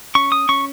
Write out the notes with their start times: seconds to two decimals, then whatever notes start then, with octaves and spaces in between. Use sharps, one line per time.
0.15 C#4 C#6
0.32 D#6
0.49 C#4 C#6